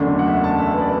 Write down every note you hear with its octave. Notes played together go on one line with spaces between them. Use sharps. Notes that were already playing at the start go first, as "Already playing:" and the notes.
Already playing: F#1 E2 D3 A3 D4
F#5
E5
A5
E5
B4
D5